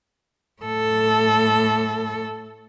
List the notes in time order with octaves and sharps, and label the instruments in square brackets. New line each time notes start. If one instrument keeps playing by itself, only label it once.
[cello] A2 A4